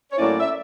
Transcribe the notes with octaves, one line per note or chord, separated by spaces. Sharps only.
C#5
A2 F#3 A#3 C#4 E4 D5
E5